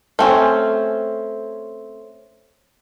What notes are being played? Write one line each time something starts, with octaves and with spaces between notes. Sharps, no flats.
A3 C4 C#4